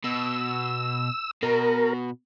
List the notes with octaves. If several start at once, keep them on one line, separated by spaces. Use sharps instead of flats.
B2 E6
B2 A#4